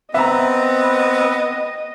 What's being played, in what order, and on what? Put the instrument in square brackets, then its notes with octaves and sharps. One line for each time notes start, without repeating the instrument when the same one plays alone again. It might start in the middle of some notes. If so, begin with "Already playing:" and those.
[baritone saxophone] B3 [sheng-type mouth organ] C4 [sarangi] D#5 [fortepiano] E5 A#5